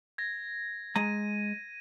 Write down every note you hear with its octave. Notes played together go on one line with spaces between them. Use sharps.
G#6 A#6
G#3 A#5 D#7